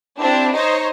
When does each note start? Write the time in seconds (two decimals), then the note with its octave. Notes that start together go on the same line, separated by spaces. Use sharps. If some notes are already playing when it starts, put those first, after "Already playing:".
0.19 C4 D4 E4 G4
0.55 D#4 C5 C#5 D#5